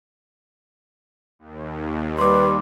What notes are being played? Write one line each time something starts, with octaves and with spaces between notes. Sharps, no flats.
D#2
G3 B4 C6 D6